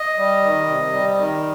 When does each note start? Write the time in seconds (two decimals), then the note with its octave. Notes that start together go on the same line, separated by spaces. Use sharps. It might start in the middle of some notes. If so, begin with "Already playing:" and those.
Already playing: D#5
0.18 G3
0.43 D#3
0.67 C3
0.92 G3
1.17 D#3